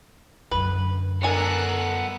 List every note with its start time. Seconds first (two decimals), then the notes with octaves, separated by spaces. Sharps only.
0.51 F#2 D3 B4
1.23 B3 D4 A4 A#4 G#5 F#6